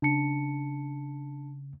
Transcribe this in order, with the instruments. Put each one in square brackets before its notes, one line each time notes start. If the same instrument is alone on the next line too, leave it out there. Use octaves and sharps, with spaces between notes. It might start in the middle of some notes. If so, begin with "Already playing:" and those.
[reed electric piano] C#3 [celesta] D4 A5 C#7